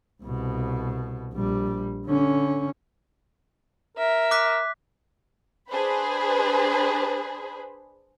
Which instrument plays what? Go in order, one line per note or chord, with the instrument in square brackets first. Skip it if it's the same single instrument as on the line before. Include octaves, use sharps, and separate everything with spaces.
[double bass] C2 B2
A#1 G3
D3 C#4
[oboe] A#4 [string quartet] E5
[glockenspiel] D6 F#6 B6
[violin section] D4 G#4 B4 C5 B5